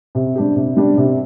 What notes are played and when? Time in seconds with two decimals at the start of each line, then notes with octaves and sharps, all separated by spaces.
0.15 C3
0.36 G3 D4 G4
0.56 C3
0.77 G3 D4 G4
0.97 C3